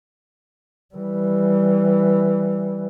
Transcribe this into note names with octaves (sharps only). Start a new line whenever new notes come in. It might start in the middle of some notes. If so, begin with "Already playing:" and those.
E3 G3